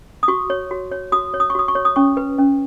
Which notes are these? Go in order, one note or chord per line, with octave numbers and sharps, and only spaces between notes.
D#6
F#4 C#6
C#5
F#4
C#5
F#4 D#6
C#5
D#6
C#6
F#4 D#6
C#6
C#5
D#6
C#4 C#6
B4
C#4